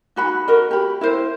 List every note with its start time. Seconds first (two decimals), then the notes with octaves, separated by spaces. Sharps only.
0.16 D#4 F#4 B5
0.48 F#4 A#4 D#5
0.71 G4 B5
1.01 E4 A#4 C5